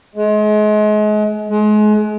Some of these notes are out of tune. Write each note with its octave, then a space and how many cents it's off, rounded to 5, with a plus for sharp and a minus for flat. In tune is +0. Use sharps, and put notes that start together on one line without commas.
G#3 +35
G#3 +35